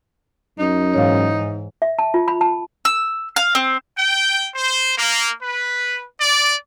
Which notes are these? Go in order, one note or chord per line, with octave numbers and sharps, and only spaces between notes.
F#2 D#4
G#2 E3 C#5 F5
E5
A5
F4
B5
A5
E6
F5
C4
G5
C5
A#3
B4
D5